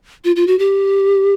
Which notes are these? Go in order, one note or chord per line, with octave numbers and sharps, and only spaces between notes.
F4
F4
F#4
G4